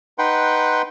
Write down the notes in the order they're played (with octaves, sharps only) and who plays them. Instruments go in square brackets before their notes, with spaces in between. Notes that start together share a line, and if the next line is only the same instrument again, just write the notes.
[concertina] D#4 B4 F#5 G5 C6